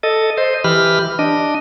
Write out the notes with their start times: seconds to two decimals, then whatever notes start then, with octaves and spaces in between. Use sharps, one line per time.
0.03 A4 D#5
0.38 C5 D#5
0.64 E3 G4 B5 F6
1.19 D4 D#5